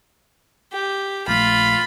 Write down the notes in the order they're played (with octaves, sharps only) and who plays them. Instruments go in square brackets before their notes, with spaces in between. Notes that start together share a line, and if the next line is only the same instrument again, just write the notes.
[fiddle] G4
[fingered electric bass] A#1 A3 [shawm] F4 [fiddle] B5